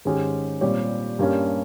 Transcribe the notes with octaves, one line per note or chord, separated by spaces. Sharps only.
G#2 D#3 G#3 C#4 G4
A#2 G3 C4 G4 C#5
G2 G3 A#3 C#4